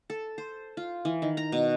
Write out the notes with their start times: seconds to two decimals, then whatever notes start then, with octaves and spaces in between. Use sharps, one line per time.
0.10 A4
0.38 C5
0.77 F4
1.05 E3
1.22 D#3
1.37 A#5
1.52 B2